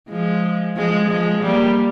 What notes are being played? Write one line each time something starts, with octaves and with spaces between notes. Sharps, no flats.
F3 G#3
F3 G#3
F3 G#3
G3 A#3